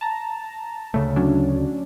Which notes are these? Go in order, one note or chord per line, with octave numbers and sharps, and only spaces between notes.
A5 A#5
D2 C#3 A3
F#3 C#4 D4